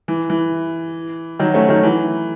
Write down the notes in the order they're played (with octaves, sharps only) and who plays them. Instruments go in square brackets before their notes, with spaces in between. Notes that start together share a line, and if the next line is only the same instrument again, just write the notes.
[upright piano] E3
E3
D#3 F#3
A3 C#4
D#3 F#3
E3